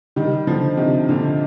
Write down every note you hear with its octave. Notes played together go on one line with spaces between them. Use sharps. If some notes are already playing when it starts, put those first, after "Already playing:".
D#3 G3
D3 F3
C3 D#3
A#2 D3